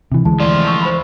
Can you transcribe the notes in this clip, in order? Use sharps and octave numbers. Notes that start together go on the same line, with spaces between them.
C3 E3
D2 E3 G#3 A5
F3 A3 F4 D5
C6 C#6 E6
C5 B5